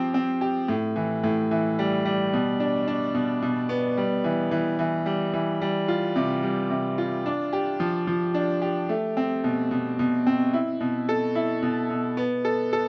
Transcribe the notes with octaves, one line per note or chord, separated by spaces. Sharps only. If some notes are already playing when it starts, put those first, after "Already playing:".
Already playing: F3 C4 G4
C4
G4
A2
E3
A2
E3
G3
G3
B2
D4
D4
B2
B2
B3
G3
E3
E3
E3
G3
E3
G3
F4
C3
G3
C3
F4
D4
G4
F3
F3
D4
G4
A3
C4
B2
B2
B2
C4
E4
B2
A4
E4
B2
B2
B3
A4
A4